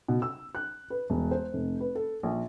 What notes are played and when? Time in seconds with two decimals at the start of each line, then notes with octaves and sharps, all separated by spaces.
0.08 B2
0.22 E6
0.55 F#6
0.90 B4
1.10 E1
1.31 C5
1.53 F1
1.80 B4
1.95 A4
2.23 A#1